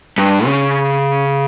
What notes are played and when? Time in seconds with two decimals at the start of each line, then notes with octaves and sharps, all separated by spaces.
0.18 G2
0.45 C#3